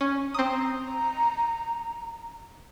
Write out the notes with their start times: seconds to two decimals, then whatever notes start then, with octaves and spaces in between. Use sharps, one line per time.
0.01 C#4
0.34 C4 A#5 D#6